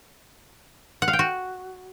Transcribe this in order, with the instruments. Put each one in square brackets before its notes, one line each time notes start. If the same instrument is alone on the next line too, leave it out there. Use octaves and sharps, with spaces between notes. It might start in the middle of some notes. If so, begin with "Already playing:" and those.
[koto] F#5
F5
G5
F#4